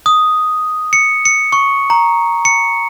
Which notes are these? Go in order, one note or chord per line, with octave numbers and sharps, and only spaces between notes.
D#6
C#7
C#7
C#6
A#5
C#7